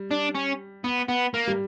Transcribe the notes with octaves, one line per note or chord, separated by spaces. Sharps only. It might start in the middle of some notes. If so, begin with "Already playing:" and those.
Already playing: G3
D4
C#4
B3
B3
A#3
G3